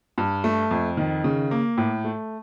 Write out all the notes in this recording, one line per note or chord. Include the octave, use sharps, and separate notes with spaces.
G2
A3
F2
D#3
C#3
A#3
A2
A3